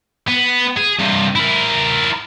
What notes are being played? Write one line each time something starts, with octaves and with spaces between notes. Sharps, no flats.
B3
G#4
G2 C3
E4 A#4